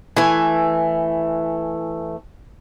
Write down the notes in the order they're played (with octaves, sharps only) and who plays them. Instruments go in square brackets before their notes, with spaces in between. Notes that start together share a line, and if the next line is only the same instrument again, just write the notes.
[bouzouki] E3 A3 G#5